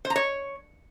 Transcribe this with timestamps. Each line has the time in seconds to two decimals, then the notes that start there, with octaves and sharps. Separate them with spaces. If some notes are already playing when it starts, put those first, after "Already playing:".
0.05 C5
0.10 A#5
0.16 C#5